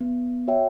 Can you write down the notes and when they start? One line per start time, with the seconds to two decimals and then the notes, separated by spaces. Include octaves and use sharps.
0.01 B3
0.48 F#4 C#5 E5 G5